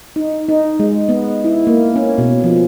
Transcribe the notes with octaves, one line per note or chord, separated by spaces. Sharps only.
D#4
D#4
G#3
B3
E4
A#3
C#4
B2
F3